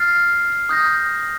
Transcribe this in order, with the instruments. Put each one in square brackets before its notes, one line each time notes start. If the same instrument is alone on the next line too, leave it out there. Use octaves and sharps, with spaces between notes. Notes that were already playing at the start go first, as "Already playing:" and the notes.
Already playing: [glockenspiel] F6 A6 C7
D#6 G6 A#6